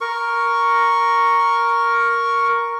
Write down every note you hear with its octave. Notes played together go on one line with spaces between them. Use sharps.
A#4 C#6